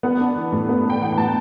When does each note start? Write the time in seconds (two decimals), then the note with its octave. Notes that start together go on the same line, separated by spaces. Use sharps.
0.03 B3 F#5
0.20 D4
0.36 E3
0.52 A2
0.69 B3
0.85 D4
0.90 G5
1.02 E3 F#5
1.12 G5
1.17 A2 A5